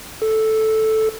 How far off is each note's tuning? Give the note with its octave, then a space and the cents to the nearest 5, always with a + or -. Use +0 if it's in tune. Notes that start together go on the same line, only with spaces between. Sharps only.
A4 -5